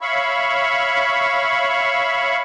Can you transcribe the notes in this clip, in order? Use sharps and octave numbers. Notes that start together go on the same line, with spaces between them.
C#5 E5 F5 B5 C#6